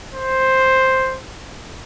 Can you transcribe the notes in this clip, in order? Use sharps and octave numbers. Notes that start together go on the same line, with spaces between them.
C5